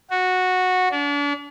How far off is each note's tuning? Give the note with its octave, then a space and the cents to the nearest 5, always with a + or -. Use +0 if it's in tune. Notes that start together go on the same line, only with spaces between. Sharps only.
F#4 -10
D4 -40